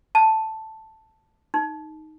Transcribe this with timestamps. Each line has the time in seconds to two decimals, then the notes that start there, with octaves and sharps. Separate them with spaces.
0.15 A5
1.54 D#4